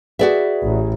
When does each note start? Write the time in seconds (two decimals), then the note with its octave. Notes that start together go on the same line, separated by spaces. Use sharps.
0.19 F#4 G#4 B4 D5 E5
0.63 A1